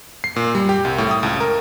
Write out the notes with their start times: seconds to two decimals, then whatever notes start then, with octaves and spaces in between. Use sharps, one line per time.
0.24 C7
0.36 A#2
0.55 G3
0.69 G4
0.85 C2
0.98 A2
1.11 D#6
1.23 C#2
1.41 A#4